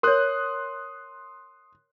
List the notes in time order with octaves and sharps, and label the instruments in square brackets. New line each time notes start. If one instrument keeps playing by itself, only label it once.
[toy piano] A#4 C#5 [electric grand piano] C6 D#6 F#6